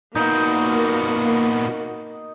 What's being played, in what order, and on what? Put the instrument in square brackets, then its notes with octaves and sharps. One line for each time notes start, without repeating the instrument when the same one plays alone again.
[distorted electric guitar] A#2 B3 [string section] A#3 F#4 [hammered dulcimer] D#4